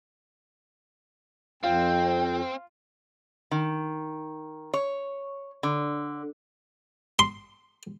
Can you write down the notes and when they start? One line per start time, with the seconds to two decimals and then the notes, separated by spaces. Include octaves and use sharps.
1.63 F2 C4 F4 G5
3.51 D#3
4.74 C#5
5.63 D3
7.19 C6